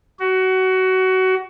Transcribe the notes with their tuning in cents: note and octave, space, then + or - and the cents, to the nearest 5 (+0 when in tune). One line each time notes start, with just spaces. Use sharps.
F#4 +20